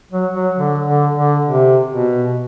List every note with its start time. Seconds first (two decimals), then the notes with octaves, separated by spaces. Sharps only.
0.12 F#3
0.33 F#3
0.56 D3
0.86 D3
1.16 D3
1.46 C3
1.91 B2